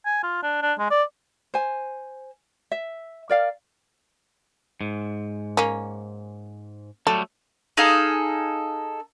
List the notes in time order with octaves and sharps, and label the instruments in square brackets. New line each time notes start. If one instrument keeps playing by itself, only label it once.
[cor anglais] G#5
F4
D4
D4
G#3
D5
[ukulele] C5 G#5
E5
A#4 D5 F5
[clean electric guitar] G#2
[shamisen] A#3 C#4
[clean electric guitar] F#3 G3 A3 [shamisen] A4
[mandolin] D#4 G#4 A4 F5